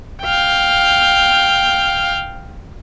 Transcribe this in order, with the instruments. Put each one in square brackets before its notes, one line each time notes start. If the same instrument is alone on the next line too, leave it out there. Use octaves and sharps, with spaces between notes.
[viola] F5 G5